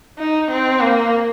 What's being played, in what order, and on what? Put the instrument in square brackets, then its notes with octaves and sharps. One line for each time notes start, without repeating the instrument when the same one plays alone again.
[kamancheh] D#4
C4
A#3